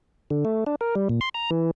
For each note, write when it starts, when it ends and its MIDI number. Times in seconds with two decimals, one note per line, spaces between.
0.31 0.44 50
0.45 0.64 57
0.67 0.75 62
0.81 0.95 70
0.95 1.08 55
1.09 1.20 46
1.21 1.29 84
1.34 1.50 82
1.50 1.71 52